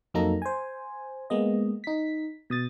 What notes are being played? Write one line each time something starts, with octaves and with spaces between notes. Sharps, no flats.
F2 F#3 A#3 D#4 A4 A#5
C5 G#5
G#3 A#3 B3 D#5
D#4 B6
B2 D#6 A6